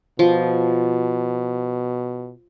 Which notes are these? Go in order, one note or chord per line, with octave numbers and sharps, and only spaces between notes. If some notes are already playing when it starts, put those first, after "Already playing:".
B2 F3